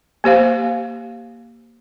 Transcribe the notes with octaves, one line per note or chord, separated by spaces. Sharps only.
A#3 G4 C5 F5